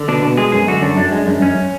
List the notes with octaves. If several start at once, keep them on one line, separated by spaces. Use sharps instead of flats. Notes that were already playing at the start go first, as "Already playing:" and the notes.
Already playing: D3
B2 D4
B2
G#3 G#4
F#2 G#4
D3 F#4
F#2 D4
F#2 D4
G#3
F#2
F#2 C#4